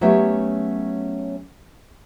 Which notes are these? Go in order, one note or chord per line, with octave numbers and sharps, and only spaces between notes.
F#3 A3 B3 C#4 G4 C#5